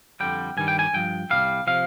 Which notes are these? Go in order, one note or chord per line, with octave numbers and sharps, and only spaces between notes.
F2 D3 G3 G5
G2 D#3 G3 G#5
G5
G#5
G2 F3 G5
C2 C3 G3 F5
C3 F3 F5